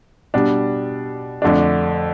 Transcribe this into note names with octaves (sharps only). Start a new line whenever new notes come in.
B2 G3 D4
F2 D3 A3 D4